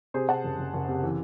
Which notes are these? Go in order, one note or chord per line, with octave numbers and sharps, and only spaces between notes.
C3 G#4 C5
C3 F#5 A5
F#1
F#1
F#1
C3
E3